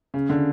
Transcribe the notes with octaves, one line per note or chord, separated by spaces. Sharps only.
C#3
D3